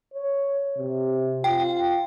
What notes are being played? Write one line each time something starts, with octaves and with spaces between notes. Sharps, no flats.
C#5
C3
F4 G5